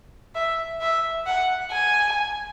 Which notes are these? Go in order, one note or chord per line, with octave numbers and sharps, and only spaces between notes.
E5
E5
F#5
G#5